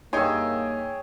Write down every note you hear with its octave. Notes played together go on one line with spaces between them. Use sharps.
G2 A#3 D#4 G#4 C#5 E5 G5